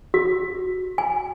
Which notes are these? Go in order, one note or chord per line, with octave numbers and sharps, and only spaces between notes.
F#4
G#5